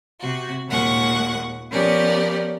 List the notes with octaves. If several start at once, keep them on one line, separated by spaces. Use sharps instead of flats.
C3 F#4
D#2 A#2 G#3 A#3 F#5 C#6
F3 B3 C#4 G4 A#4 D5